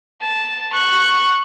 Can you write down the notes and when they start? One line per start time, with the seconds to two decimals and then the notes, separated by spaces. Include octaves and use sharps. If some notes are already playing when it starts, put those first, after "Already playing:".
0.21 A5
0.73 C#6 F#6